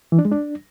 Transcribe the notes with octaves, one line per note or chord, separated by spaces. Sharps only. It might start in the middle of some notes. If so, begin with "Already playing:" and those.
E3
D4
G#3
D4